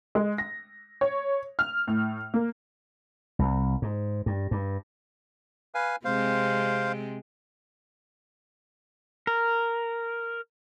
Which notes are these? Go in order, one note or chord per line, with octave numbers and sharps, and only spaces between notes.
G#3
A#6
C#5
F6
A2
A#3
C2
G#2
G2
G2
B4 F5 G#5
C3 G#3 C4 C5 F5
A#4